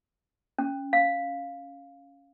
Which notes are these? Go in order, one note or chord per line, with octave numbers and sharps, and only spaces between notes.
C#4
F5